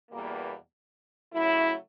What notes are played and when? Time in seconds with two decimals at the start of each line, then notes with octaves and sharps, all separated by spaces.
0.10 E2 B2 G3 A#3
1.32 C#3 F#3 A3 E4